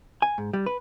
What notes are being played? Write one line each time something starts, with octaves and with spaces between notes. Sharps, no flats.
G#5
G#2
G3
B4